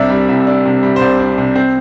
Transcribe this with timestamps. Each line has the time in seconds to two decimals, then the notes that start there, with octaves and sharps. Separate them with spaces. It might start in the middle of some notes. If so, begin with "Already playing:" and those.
Already playing: C2 C3 G3 D4 D5 E5
0.10 G3
0.29 C2
0.47 D4
0.66 C3
0.83 G3
0.96 C5
1.01 C2 D5
1.19 D4
1.38 C3
1.56 C4